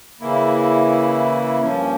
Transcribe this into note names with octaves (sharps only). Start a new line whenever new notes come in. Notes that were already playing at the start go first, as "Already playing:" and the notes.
C#3 E3 A#3 E4
G2 F3 A#3 C#4